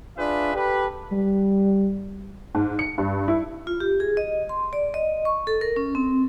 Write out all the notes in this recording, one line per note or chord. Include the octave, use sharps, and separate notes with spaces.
D4 F4 G#4 B4 E5
G4 A4 B4
G3
G#2
C#7
G2
E4
F4
G4
G#4
D#5
C6
D5
D#5
C#6
A4
A#4
C#4
C4